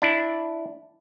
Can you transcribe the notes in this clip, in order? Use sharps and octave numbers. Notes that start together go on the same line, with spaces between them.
D4 E4